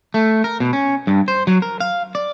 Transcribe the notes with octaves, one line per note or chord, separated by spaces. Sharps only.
A3
A#4
B2
C#4
G2
C5
F#3
A#4
F5
D5